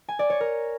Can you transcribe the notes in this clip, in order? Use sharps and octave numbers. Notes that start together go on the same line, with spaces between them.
G#5
D5
C#5
A#4